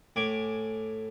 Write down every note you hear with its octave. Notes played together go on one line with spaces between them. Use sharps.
A2 G#5 D6